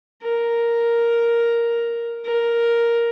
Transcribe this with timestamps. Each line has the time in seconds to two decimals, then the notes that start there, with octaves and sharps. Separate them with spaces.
0.22 A#4
2.24 A#4